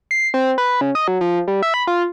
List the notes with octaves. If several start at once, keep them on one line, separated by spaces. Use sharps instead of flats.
C7
C4
B4
C#3
D#5
F#3
F3
G3
E5
B5
F4